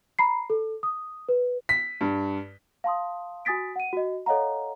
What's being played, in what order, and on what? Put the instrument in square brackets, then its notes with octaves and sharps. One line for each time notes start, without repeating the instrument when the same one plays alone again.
[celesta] A#5 B5 C7
A4
D#6
B4
[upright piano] B6
G2
[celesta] F5 A5 C6 D#6
F#4 G#5 D#6 A6 B6 D7
F#5 D#7
F#4 D#5
A4 C#5 D#5 F5 F#5 A#5